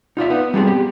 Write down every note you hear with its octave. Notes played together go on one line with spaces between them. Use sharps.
D#4 F4 D5 E5
B3
G3 B3 C4 G#4
G4